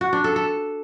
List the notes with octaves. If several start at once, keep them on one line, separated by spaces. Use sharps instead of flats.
F#4
D4
A4
A4